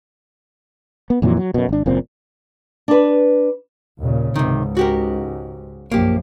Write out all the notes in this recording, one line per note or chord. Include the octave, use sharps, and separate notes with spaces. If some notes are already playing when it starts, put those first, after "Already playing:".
B3
F2 A#2 E3 F#3
F#3
F#2 B2
G#1 D4
F#1 A#2 C4
D4 B4
D#2 A#2 C#3
C#2 G#2 C3 D#3
F#4 G4 A#4
A#1 F#2 F3 A#3 G4